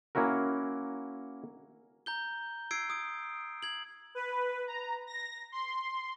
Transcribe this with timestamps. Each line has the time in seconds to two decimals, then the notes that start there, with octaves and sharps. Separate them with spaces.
0.15 A#3 C#4 E4 F#4 A#4
2.06 A#5 G6 G7
2.71 E6 G#6 C7 D7
2.90 D#6 D7
3.62 G#6 F#7
4.15 B4
4.67 A#5
5.07 A#6
5.52 C6